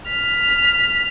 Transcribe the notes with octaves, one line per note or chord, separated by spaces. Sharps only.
F6 B6